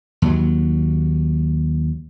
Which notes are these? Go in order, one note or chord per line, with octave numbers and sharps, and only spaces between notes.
D#2 F#3